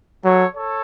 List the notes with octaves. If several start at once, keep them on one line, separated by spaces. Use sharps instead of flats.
F#3 A4 C#5
A4 C#5